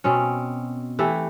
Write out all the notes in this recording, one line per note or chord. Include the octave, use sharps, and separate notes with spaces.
B2 C4 C#4
E3 A3 E4 G4